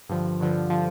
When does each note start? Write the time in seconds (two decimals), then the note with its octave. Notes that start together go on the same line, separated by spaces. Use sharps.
0.09 G2 D3 F3
0.40 G2 D3 F3
0.70 D3 F3